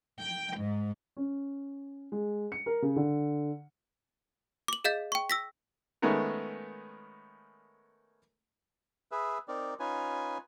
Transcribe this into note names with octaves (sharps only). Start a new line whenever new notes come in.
G5
G#2
C#4
G#3
C#7
A#4
C#3
D3
D6 F#7
G#4 D#5 F5 G6 A6 B6
G5 C#6
E6 A#6 B6
D#3 G#3 A3 B3 C#4 A#4
G#4 B4 E5
C4 D#4 A#4 D5
C#4 D#4 F4 B4 G#5